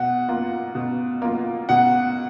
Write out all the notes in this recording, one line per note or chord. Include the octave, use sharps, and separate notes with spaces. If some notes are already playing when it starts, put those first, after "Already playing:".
Already playing: B2 F#5
A#3 F4
B2
A#3 F4
B2 F#5